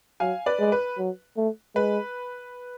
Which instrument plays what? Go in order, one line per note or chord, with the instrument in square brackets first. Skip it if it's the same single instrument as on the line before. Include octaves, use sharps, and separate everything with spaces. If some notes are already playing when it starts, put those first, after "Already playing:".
[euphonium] F#3 [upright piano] F5 G#5
[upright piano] B4 D5
[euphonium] G#3
[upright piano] B4
[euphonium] F#3
A3
[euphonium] G#3 [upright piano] B4